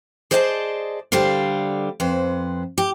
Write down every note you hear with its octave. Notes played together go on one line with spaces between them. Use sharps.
G#4 C5 D5 D#5 F#5 A5
D3 G3 C5 F5
F2 B4 C5
G4